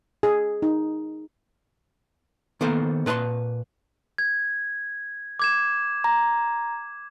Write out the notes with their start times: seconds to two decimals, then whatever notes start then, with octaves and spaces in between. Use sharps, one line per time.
0.23 G#4
0.62 D#4
2.61 D#3 A#3 B3 A4 C5
3.06 A#2 B4 A5 B5 C6
4.18 G#6
5.39 D6 G#6 E7
6.04 A#5